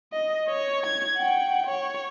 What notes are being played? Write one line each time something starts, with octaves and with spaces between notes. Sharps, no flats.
D#5
C#5
G#6
F#5 G5
C#5